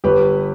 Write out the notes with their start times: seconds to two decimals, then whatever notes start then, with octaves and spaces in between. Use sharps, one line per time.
0.04 G1 G4 B4